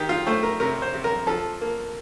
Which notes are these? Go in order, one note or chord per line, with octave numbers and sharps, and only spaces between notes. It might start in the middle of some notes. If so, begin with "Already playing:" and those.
Already playing: D#3 G4
F4
A3 C5
A#4
C3 A#4
C5
C3
A#4
F3 A4
A#3